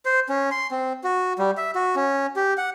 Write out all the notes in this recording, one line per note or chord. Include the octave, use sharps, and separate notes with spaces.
C5
C#4
C6
C4
F#4
G3
E5
F#4
C#4
G4
F#5